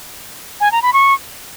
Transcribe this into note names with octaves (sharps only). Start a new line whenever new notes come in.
G#5
A#5
B5
C#6